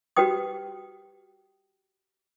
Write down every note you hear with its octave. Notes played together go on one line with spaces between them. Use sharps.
F#4 G4 B4 G5 D#6